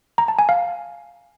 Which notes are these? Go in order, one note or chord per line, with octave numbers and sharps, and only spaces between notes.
A#5
A5
G#5
F5